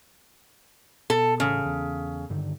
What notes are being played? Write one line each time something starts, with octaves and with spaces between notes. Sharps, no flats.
B2 A4
A1 C#3
E2
G2 D3 D#3